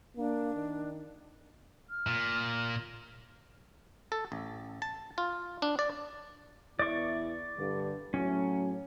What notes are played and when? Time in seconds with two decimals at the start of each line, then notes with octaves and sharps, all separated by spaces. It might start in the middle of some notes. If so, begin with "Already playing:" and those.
0.17 A#3 D4
0.54 D#3
1.89 F6
2.06 A#2
4.12 A4
4.32 A1
4.82 A5
5.18 F4
5.62 D4
5.79 D5
6.79 E2 E4 D5 C#6
7.57 G2 D3
8.14 A2 F#3 C#4